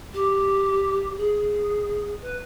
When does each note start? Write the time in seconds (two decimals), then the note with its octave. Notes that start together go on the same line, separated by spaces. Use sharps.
0.14 G4
1.17 G#4
2.22 B4